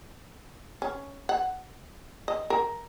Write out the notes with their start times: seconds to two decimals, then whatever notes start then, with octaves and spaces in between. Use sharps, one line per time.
0.82 C#4
1.29 F#5
2.28 D#5
2.50 A#4